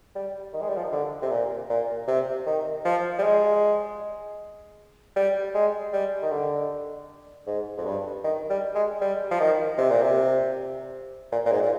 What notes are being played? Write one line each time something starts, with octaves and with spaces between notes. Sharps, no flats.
G3
D#3
G#3
G3
F3
D#3
D3
C3
A#2
A#2
C3
D#3
F3
G3
G#3
G3
G#3
G3
D#3
D3
G#2
F2
G2
D#3
G3
G#3
G3
F3
D#3
C3
A#2
C3
A#2
A#2
G#2
A#2